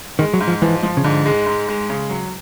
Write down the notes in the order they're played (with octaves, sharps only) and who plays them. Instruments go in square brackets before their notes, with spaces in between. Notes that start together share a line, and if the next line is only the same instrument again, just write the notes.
[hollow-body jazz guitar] D#3 [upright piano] G#3
[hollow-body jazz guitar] F#3
[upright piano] G#2
[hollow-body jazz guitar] F3
[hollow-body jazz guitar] E3 [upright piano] F3
[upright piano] F3
[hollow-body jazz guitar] C#3
[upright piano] G#2 [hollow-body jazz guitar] D3
[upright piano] G#3
G#2
G#3
C#3
F#3